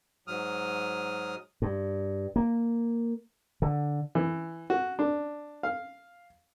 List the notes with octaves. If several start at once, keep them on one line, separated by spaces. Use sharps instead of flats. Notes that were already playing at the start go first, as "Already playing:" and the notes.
G#2 F#3 D#6 F6
G2
A#3
D3
E3
F#4
D4
F5